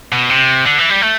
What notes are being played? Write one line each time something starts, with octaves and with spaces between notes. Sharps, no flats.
B2
C3
D3
E3
G3
A3